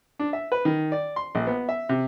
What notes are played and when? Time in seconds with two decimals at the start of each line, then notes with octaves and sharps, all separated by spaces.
0.19 D4
0.33 E5
0.52 B4
0.65 D#3
0.92 D5
1.16 C6
1.35 A#1
1.47 B3
1.69 E5
1.89 C3